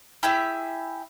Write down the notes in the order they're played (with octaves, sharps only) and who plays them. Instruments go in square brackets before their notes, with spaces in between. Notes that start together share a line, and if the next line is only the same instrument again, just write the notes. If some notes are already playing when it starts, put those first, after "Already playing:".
[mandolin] E4 G4 G#4 E5